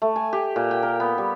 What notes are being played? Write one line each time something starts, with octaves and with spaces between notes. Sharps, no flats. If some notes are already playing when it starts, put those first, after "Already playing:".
A3
G#5
G4
A#2
G5
A#4
B3
G3